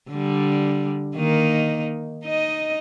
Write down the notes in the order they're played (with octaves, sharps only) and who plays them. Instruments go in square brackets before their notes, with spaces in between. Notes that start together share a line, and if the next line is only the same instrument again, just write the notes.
[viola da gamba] D3 G3
D#3 A#3 D#4
D#4 D#5